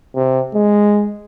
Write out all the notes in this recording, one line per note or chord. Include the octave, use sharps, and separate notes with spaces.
C3
G#3